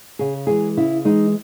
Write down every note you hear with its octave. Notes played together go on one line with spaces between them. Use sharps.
C#3 G#4
E3 G#3 G#4
C#3 E4
E3 G#3 D#4